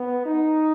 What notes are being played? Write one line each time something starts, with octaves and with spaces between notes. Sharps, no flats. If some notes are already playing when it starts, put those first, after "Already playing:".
Already playing: B3
D#4